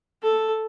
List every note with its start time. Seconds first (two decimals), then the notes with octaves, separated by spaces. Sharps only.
0.23 A4